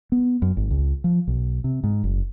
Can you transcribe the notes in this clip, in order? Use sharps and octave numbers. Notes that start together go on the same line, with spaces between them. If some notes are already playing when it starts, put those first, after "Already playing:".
B3
F#2
G#1
C#2
F3
B1
C3
G#2
F#1